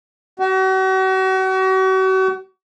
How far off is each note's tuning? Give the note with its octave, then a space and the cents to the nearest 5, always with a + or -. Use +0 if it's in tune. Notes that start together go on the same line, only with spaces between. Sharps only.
F#4 +40